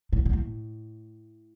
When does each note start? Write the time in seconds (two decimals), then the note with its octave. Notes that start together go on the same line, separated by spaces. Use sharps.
0.13 A2
0.26 B2
0.33 A2